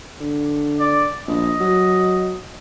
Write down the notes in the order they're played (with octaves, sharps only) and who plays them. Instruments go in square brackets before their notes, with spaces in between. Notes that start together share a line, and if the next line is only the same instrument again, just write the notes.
[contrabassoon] D3
[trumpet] D5
[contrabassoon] A#1 [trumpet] D#5
[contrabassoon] F#3